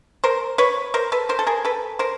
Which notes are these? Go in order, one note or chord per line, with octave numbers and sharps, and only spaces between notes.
A#4 C5
B4 C#5
A#4 C5
A4 B4
A#4 C5
A4
G#4 A#4
A4 B4
A#4 C5